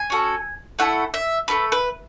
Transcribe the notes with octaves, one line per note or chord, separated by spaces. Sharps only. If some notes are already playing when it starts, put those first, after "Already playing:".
Already playing: G#5
C#4 F#4 A4
A3 E4 A4 F#5
E5
A3 E4 A4 B4
B4